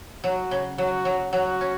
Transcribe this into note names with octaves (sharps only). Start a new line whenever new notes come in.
F#3 F#4
C#3
F#3 F#4
F#3
F#3 F#4
C#4